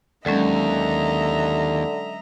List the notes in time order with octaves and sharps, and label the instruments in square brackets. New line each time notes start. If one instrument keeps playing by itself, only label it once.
[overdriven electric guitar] D#2 [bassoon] D3 [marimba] F#3 G#3 C#4 [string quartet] D#5 E5 A#5